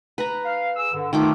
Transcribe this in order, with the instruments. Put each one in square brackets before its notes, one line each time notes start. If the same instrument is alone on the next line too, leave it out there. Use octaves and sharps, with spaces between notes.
[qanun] B4 A#5
[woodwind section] F5
G#4 E6
G2 D3
[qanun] D#3 A3 D6 [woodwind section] F4 G#4